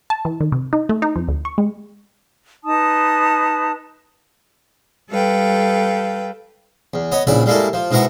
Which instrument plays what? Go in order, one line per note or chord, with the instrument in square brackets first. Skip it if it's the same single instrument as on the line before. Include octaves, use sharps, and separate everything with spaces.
[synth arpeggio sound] A5
E3
D#3
C3
D#4
A3
D#4
F2
D2
C#6
G#3
[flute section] D#4 B4 A5 D#6
[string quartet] G3 A4 B4 F5 G5
[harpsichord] E2
B3 C#5 D#5
A#1 C#3 E4 D5 B5
G3 G#3 A#3 E4 A4
F3
G#2 B2 E4 A#4 F#5 C#6